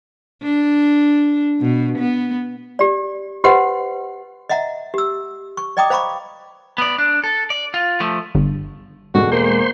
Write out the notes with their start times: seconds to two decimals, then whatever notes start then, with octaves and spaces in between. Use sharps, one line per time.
0.43 D4
1.61 B2
1.99 B3
2.79 G4 D5
3.44 F#4 G4 B4 C5 D#5 F#5
4.49 D#5 E5 F#5 A#5
4.94 G4 E6
5.57 C#6
5.77 D5 D#5 G5 A#5 D6 D#6
5.90 C5 F5 A#5 B5 C#6 D6
6.78 B3 D5
6.98 D4
7.24 A4
7.50 D5
7.74 F4
8.00 F3 A3
8.35 G1
9.14 E1 G#2 G#3 F#4 A4
9.32 A#3 C5 C6